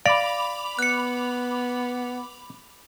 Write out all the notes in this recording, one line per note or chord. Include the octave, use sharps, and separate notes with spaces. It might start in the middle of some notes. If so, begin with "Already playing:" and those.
D5 F5 B5 D6 F7
B3 F#6 C#7